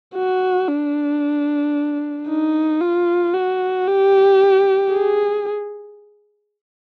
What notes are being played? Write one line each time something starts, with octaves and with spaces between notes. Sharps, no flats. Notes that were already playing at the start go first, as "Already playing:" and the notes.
F#4
D4
D#4
F4
F#4
G4
G#4